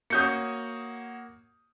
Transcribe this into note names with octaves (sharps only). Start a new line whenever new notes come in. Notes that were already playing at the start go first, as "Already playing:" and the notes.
A#3 F#4 C#5 D#6 G6 C#7